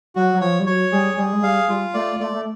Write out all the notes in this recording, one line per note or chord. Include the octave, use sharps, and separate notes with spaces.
F#3 F#4
F#3
F3 C#5
G3
F#3 C#5
G3 G#4
G3 G#4
G#3
G3 F5
G3 F4
A3 D5
A3 D5
A3